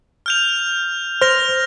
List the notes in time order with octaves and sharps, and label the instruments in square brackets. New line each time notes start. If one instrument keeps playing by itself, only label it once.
[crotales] F6 G6 F7
[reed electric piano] C5 [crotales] F6 A#6 F7